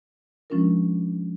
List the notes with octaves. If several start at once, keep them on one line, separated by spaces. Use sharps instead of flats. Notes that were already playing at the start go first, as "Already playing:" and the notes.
F3 G#3 C#4 D4 F4 A#4